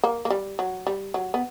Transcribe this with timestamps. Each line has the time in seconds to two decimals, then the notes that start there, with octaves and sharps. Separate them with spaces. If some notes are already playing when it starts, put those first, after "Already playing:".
0.04 A#3
0.25 A#3
0.30 G3
0.59 F#3
0.87 G3
1.14 F#3
1.34 B3